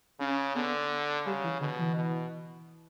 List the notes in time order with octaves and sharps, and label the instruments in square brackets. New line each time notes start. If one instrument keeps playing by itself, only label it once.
[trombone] C#3 [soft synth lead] C#4
[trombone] D3 [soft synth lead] B3
[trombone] C#3 [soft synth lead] G3
[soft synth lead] E3
[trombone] B2 [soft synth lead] D3
[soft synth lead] E3
[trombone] B2